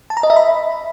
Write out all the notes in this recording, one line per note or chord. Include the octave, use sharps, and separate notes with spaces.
A5
A#5
D#5
E5
B5